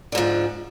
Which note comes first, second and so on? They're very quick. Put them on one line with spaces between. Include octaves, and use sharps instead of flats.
D3 G#2 F3